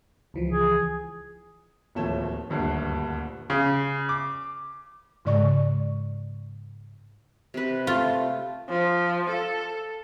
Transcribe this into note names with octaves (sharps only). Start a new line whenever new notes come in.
C#2 E3 F3
G#4
D1 D#2 F3 A3 C#5 E7
D#1 D2 G2 A3 C7
C#3
D6
G#2 C#3 G#3 D5 C#6
C3 B4
A3 F4
F3
A4